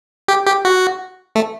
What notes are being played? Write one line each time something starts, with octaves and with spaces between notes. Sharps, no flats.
G4
G4
F#4
A3